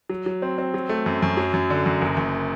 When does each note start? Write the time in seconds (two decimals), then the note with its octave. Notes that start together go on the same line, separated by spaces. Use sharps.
0.09 F#3
0.26 F#3
0.42 C4
0.58 C4
0.74 F#3
0.89 A3
1.06 F#2
1.22 F#2
1.37 F#3
1.54 F#2
1.70 D3
1.86 F#2
2.02 F#1
2.17 F#1